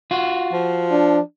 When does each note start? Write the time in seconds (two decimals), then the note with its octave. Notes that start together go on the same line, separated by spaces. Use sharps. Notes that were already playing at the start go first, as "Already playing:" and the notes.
0.11 F4 F#4
0.53 F3
0.91 D4